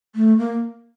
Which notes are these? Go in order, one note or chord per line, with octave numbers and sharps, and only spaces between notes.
A3
A#3